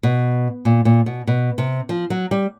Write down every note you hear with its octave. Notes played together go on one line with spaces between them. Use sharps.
B2
A#2
A#2
B2
B2
C3
F3
F#3
G3